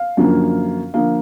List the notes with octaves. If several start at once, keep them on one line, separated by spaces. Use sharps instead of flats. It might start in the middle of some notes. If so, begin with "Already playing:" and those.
Already playing: F5
F#2 D3 F3 A#3
D3 F3 A#3 F5